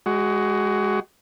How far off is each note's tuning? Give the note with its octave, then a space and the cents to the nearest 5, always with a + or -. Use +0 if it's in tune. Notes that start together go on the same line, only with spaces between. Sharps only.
G#3 +0 F#4 +25